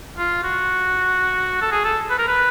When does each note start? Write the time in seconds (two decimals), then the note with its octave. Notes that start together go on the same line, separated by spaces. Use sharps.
0.18 F4
0.44 F#4
1.61 A4
1.71 G#4
1.85 A4
2.10 B4
2.19 A#4
2.28 B4